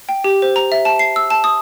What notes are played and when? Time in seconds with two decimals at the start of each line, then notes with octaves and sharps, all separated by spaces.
0.09 G5
0.24 G4
0.42 C5
0.56 A#5
0.72 E5
0.85 A5
0.99 C7
1.16 E6
1.30 A5
1.44 D#6